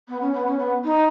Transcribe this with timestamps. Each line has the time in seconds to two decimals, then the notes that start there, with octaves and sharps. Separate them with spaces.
0.08 B3
0.21 C#4
0.34 B3
0.46 C#4
0.58 B3
0.84 D#4